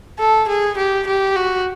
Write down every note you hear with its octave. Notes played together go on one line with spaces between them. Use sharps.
A4
G#4
G4
G4
F#4